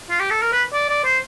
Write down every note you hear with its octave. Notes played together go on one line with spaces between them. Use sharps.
F4
G4
A4
A#4
B4
D5
D5
C5